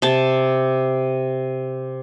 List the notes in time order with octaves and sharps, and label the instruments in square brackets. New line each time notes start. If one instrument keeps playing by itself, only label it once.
[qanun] C3 A5